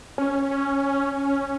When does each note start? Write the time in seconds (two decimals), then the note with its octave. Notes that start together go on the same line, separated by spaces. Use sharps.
0.18 C#4